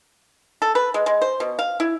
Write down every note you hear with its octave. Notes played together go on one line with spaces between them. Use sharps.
A4
B4
G#3
G#3
C5
B2
F5
E4